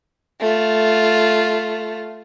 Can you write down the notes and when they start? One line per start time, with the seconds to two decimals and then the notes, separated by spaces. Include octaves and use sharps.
0.40 A3 F4